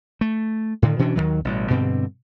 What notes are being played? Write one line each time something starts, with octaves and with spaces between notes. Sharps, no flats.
A3
A2 D3 D#3
B2 E3 C#4 D4
D#2 B2 D#3 F#3
A1 B2 G3
G2 B2 D3 C4